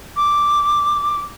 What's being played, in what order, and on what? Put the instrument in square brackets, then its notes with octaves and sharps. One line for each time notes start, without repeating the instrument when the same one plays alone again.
[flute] D6